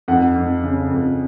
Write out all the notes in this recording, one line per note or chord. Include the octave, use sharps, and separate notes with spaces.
F2 F#5
F2
C#3
F2